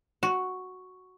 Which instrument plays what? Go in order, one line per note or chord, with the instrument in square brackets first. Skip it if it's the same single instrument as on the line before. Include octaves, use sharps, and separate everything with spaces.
[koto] F#4